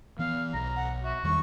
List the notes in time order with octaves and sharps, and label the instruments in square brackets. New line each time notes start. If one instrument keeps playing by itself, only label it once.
[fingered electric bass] E3 B3 [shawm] F5
[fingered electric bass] B1 [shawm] A#5
[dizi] F#5
[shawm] F#4 [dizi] E5
[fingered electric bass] E2 D#3 G3 [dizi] C#6